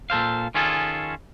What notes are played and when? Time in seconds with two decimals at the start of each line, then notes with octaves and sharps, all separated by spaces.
0.10 A#2 A4 C5 F5
0.55 D#3 C#4 F4 G#4 A4